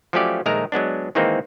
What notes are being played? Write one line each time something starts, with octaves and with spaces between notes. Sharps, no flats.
F3 F#3 A3 C#4 G4 D5
A#1 D#3 G#3 A3 A#4 A#5
F#3 G#3 B3 D4
D#3 E3 G#3 A#3 C4 D#4